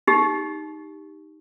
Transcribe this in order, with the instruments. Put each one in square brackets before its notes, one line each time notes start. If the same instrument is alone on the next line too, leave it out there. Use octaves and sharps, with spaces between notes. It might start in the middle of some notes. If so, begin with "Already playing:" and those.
[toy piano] D#4 G4